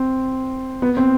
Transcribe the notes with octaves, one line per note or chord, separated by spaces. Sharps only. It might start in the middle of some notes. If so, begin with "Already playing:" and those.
Already playing: C4
B3
C4